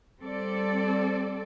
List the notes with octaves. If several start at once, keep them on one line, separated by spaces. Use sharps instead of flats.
G3 C4 A4 D5